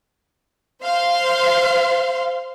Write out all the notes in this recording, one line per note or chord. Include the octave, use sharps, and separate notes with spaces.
C5 F5 C6